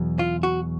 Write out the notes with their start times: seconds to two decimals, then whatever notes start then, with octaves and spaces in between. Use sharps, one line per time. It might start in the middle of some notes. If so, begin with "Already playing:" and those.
Already playing: E2 B2 F#3
0.19 F4
0.43 F#4